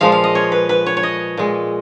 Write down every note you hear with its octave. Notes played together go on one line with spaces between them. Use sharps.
A#2 F3 G#3 F5
F5
D#5
C#5
B4
B4
C#5
C#5
D#5
A#2 G#3